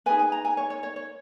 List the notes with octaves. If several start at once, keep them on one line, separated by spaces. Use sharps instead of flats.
D#4 G#4 B4 G#5
G#5
A#5
G#5
C#5
C#5
C#5
C#5